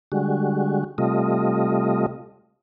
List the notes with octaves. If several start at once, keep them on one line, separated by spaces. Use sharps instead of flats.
D3 G3 G#3 F#4
C3 G3 A3 F4 D#5